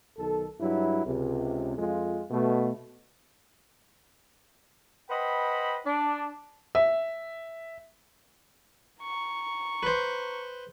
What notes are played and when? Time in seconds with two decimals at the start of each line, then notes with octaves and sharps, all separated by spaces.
0.18 B1 D#3 A4
0.61 G2 F#3 E4
1.05 C#2 C3
1.77 F2 G#3 F4
2.31 B2 A3
5.10 B4 C5 D#5 F#5 G5 B5
5.86 D4
6.75 E5
9.01 A#5 C#6
9.83 B4 C5